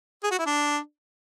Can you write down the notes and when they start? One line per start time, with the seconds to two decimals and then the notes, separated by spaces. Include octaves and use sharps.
0.24 G#4
0.31 F#4
0.39 E4
0.46 D4